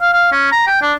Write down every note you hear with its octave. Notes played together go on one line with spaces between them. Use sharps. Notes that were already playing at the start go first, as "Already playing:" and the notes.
F5
F5
C#4
A#5
G5
D4